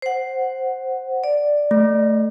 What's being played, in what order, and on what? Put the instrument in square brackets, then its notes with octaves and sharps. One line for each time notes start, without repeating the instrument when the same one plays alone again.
[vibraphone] C5 F#5
D5
[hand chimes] A3